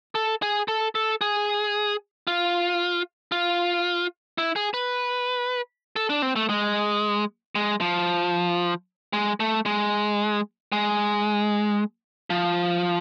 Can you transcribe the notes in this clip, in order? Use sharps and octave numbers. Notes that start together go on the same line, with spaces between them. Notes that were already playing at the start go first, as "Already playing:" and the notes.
A4
G#4
A4
A4
G#4
F4
F4
E4
G#4
B4
A4
D4
C4
A3
G#3
G#3
F3
G#3
A3
G#3
G#3
F3